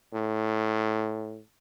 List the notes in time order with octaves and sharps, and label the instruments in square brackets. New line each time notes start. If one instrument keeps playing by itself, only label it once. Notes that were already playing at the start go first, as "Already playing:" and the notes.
[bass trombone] A2